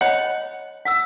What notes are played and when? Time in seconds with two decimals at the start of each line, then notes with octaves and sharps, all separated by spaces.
0.01 C#5 D#5 F#5 B5
0.85 F#5 D#6 E6